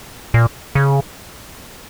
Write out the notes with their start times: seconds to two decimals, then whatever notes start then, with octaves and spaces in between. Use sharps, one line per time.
0.34 A#2
0.75 C#3